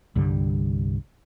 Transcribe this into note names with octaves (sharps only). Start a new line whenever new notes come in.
C2 G2 D3 G3